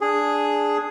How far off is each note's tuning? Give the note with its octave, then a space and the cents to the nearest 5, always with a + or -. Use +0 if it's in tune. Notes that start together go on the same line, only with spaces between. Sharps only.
D4 +0 G#4 +0